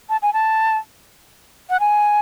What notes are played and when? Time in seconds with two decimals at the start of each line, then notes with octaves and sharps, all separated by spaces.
0.10 A5
0.22 G#5
0.33 A5
1.70 F#5
1.80 G#5